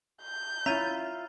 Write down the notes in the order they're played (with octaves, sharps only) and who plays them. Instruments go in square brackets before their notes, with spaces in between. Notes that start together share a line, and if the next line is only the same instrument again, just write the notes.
[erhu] G6
[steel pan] C#4 E4 [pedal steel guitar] F4 E5 [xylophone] A#5 D#7